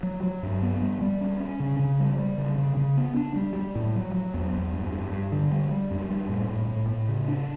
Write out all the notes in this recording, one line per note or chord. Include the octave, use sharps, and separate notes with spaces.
F#3
F#3
G2
B3
G3
G3
C#4
C#4
C#3
C#3
G3
G3
C#3
C#3
C#3
B3
D4
G3
G3
A2
F#3
F#3
E2
E2
G2
G2
G2
D3
G3
G3
F#2
G3
A2
A2
A2
A2
C#3
D4